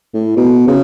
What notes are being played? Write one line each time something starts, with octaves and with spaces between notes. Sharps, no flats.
A2
B2
C#3